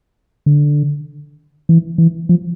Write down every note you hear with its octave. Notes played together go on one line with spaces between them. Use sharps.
D3
E3
E3
F3